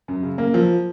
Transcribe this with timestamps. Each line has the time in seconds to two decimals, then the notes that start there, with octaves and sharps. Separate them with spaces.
0.08 F#2
0.23 C#3
0.38 A#3
0.54 F3